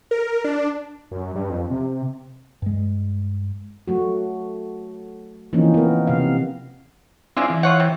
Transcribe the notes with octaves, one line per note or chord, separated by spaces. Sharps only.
A#4
D4
F#2
G2
F2
C3
G2 G#3
F#3 A3 F#4
E3 F3 A#3 C4 C#4 D#4
B3 A#4
C3 F5
G#3 C4 D4 E4 F4
E3
F4 C#5 F#5
C3